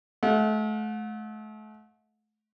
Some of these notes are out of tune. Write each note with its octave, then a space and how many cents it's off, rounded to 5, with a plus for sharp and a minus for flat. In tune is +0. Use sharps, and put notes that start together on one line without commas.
A3 -35 F#5 -40